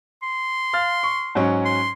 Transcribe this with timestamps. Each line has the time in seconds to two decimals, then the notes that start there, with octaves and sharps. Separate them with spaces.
0.22 C6
0.73 F5 F6 A6
1.03 C#6
1.35 G#2 F#3 C#4
1.65 C6